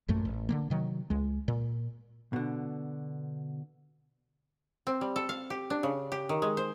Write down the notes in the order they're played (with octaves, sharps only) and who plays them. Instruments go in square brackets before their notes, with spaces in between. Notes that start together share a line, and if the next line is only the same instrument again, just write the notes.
[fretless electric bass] A1 F#2 A#2 A3
A1
D3 D#3 A#3
C3 D#3 F#3
C#2 G#3
A#2
[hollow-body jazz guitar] B2 D3
[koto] C4
G3
A4
F5
G4
D4
C#3
G4
D#3
G#3
C5